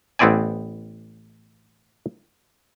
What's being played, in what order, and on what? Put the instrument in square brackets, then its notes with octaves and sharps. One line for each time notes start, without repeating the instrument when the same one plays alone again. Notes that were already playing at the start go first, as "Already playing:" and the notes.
[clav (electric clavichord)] A1 B3 C4 E4 D5 G#5